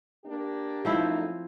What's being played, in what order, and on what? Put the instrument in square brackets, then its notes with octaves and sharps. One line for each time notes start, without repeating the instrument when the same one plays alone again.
[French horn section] A#3 D4 G4
[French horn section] F#2 A3 D#4 [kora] F3 C4 E4